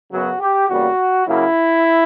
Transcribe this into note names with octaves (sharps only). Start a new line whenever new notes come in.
F#2 C#3 F#3 B3 F#4
G4
E2 C#3 G3 A#3 F#4
C#3 F#3 A#3 E4